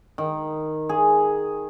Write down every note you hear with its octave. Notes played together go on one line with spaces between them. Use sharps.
D#3
G#4